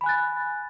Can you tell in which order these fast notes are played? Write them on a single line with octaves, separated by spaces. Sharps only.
B5 G#5 F#6 A6